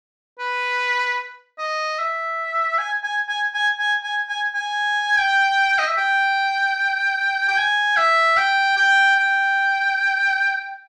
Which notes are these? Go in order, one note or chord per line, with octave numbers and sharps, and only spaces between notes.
B4
D#5
E5
G#5
G#5
G#5
G#5
G#5
G#5
G#5
G#5
G5
D#5
E5
G5
G5
G#5
E5
G5
G5
G5